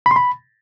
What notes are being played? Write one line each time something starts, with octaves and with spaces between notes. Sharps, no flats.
B5
C6
B5